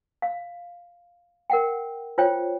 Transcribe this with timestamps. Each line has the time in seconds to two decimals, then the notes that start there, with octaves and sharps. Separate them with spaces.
0.22 F5
1.50 A#4 F#5 G5
2.18 F4 C5 C#5 G5